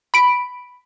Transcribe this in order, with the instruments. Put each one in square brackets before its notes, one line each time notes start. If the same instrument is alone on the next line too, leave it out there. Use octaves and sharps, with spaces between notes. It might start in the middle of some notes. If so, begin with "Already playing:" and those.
[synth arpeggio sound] B5 D7